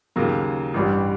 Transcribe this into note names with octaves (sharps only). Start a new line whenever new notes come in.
D#2 C#3 F#3 A#3
A1 G2 E3 G3